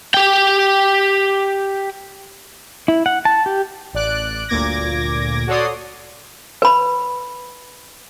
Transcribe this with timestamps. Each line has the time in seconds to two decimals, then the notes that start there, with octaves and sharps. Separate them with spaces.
0.14 G4 G5
2.88 E4
3.06 F#5
3.25 A5
3.46 G4
3.93 A1 D5 F#6 D7
4.48 G1 D2 A#2 D6 G#6 A#6
5.47 F#4 A4 C#5 D5 C6 D#6
6.62 B4 B5